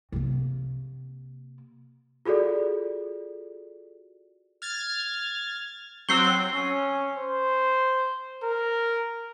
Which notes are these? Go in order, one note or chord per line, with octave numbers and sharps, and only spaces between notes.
C3 A#3
F4 F#4 G#4 A4 D5
F6 G#6 A6
F#3 C4 F#4 E6 C7 G7
C#4
C5
A#4